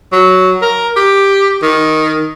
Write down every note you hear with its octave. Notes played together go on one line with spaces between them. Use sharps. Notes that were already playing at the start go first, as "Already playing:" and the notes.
F#3
A#4
G4
D#3